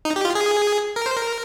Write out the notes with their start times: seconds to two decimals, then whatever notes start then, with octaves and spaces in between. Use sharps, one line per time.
0.05 D#4
0.16 G4
0.25 F4
0.35 G#4
0.96 A#4
1.06 C5
1.17 A#4